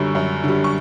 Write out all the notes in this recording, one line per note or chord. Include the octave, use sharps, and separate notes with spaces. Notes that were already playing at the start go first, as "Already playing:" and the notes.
Already playing: F#2 D3 G3 C#6
F#2
D3 G3
C#6